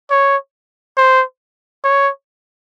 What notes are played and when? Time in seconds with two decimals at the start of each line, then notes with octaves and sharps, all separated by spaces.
0.11 C#5
0.97 C5
1.84 C#5